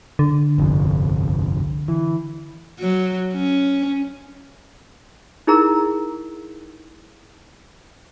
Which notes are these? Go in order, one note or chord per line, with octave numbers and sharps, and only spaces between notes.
D3
G1 C2 F2
E3
F#3
C#4
D#4 E4 G#4 A#4 A#5